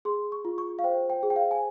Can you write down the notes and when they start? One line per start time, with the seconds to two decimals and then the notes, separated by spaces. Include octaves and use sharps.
0.05 G#4 C6
0.32 C#6
0.45 F4
0.58 C#6
0.79 F5
0.84 C5 G5
1.10 G5
1.23 G#4
1.30 G5
1.36 F5
1.51 G#5